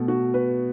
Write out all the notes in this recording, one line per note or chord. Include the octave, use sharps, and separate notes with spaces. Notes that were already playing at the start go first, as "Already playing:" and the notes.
Already playing: B2 A3
F#4
B4